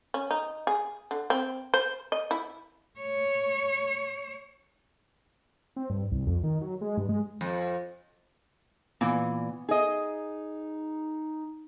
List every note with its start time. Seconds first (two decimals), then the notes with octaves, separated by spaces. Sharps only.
0.14 C#4
0.31 D#4
0.67 G#4
1.11 D3
1.30 C4
1.74 C5
2.12 D#5
2.31 E4
3.00 C#5
5.76 C4
5.90 G2
6.12 C2
6.27 F2
6.43 D#3
6.61 F#3
6.81 G#3
6.97 G2
7.09 G#3
7.41 F2
9.01 A#2 E3 B3
9.69 D#4 G#4 D#5